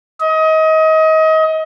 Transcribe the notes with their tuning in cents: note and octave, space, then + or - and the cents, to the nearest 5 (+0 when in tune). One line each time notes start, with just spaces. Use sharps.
D#5 +30